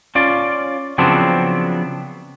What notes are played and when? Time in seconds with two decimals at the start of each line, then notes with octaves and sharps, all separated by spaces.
0.15 C#4 F4 D5
0.98 C#3 F3 F#3 B3 C4 D4